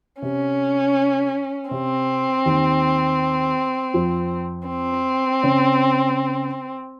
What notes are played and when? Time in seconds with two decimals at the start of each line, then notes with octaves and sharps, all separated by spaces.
0.21 C3 C#4
1.70 C3 C4
2.45 D#2 D#3
3.94 F2 F3
4.68 C4
5.43 C#3 C#4